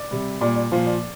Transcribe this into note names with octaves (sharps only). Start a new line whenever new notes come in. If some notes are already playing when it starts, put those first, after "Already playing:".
Already playing: D5
C3 G3
A#2 G3 D5
D5
A#2 F3 F5
D5